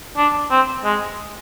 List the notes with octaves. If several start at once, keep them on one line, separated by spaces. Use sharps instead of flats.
D4
C4
G#3